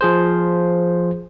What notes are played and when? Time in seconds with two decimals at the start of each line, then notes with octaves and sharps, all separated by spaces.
0.01 F3 G#4 C5